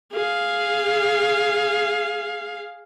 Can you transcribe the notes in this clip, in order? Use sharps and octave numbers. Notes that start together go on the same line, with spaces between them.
G#4 F5